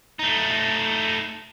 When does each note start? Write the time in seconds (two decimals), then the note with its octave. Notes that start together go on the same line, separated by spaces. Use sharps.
0.19 A3 D#4